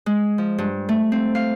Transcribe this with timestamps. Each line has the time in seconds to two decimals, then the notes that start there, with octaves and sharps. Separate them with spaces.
0.06 G#3
0.38 F3
0.58 G2
0.89 A3
1.12 C4
1.35 F5